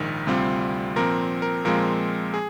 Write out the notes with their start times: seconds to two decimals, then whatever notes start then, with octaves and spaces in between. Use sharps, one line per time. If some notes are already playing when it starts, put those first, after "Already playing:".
Already playing: A#1 G#2 D#3
0.27 D2 C3 G3 C4 F4
0.96 A#2 F3 C4 A#4
1.42 A#4
1.65 A#2 F3 G#3 C4 F4 A#4
2.34 G#4